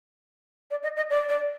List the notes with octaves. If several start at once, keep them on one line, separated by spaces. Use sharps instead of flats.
D5
D#5
D#5
D5
D5